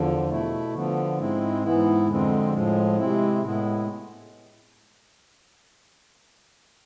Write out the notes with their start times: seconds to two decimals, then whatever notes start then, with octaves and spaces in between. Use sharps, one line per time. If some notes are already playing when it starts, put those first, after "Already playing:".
Already playing: E2 D3 F3
0.29 B2 A3 E4
0.74 D3 F3 B3
1.18 G#2 G#3 C4 E4
1.63 G#2 E3 B3 E4
2.07 F2 D3 G#3 C4
2.52 A2 F3 G#3
2.97 C3 G#3 C4 E4
3.42 A2 G#3 B3 E4